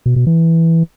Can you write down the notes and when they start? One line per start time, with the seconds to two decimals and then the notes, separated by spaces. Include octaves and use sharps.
0.06 B2
0.16 B2
0.27 E3